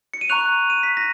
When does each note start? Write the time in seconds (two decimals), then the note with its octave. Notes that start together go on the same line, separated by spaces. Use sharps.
0.14 C#7
0.21 D#7
0.29 A#5 C#6 F#6 F7
0.70 D#7
0.83 B6
0.97 A#6